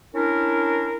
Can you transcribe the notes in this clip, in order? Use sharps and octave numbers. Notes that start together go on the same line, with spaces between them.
C#4 D4 E4 A#4